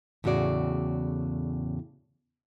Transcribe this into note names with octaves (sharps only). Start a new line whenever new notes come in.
E2 A2 C#3 F#4 D5